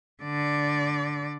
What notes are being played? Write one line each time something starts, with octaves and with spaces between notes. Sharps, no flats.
D3 D5